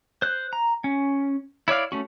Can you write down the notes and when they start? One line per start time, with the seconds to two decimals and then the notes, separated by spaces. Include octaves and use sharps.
0.22 C5 F#6
0.53 A#5
0.84 C#4
1.68 E4 C#5 D5 F5
1.92 A3 C#4 F#4